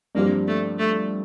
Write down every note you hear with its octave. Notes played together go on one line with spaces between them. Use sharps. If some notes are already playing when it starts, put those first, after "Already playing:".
G2 F3 A#3 C4 G4 C5
A3
A3